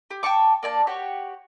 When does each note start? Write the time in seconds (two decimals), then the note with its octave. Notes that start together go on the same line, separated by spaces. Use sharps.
0.11 G4
0.23 G5 A5 C#6 D6
0.63 A#3 D5 G#5 A5
0.87 F#4 G4 C#5